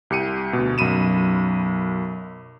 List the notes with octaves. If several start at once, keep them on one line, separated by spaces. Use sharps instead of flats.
C2 G4 C#7 D#7
D2 B2
B1 F#2 B5 D#7 E7